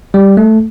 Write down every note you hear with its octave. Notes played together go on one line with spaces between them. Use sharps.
G3
A3